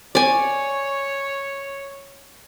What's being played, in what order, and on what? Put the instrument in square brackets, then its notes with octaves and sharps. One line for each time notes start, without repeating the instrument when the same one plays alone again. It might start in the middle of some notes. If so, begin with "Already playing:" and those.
[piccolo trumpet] C#5 [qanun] D5 G#5